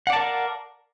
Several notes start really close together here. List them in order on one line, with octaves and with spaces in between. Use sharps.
F#5 D5 A5 A#4 F5